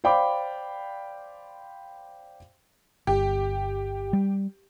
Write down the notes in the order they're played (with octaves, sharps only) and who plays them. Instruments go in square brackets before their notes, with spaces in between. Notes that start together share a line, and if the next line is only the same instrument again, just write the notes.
[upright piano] C5 D5 F5 G5 B5 D6
[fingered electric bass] G1 [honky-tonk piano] G4
[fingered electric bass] G3